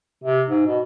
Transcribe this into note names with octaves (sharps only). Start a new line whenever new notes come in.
C3
G#2
B2